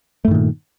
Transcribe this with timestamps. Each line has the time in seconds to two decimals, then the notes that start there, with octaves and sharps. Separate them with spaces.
0.25 A3
0.28 G2
0.31 D#3
0.34 A#2